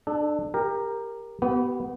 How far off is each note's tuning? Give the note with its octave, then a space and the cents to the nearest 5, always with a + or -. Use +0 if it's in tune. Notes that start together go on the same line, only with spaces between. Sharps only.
D4 +30 A4 -15
G4 +20 A#4 +0
B3 +0 G4 -40